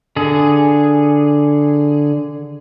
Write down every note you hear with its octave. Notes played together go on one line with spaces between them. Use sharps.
D3 G#4